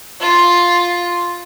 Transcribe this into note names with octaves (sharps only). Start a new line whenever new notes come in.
F4